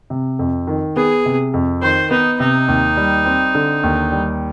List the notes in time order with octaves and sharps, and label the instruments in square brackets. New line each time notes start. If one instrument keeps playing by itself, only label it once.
[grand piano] C3
F2
D#3
[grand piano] B3 [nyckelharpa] G#4
[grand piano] C3
F2
[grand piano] D#3 [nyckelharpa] C5
[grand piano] B3 [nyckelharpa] D#4
[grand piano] C3 [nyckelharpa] D#4
[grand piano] D#2
G3
C4
D3
D#2
G3